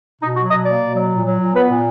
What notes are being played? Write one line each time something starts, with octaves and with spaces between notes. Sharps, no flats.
B2 D#4
F#3 F#4
B2 D#5
A#3 D5
B2
F#3
A#2
F#3
A#2
B3 B4
A#2